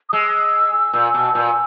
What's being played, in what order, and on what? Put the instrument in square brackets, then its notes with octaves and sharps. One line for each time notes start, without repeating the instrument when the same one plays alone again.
[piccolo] D#6
[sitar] G#3 [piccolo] E6
[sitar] A#2
B2
A#2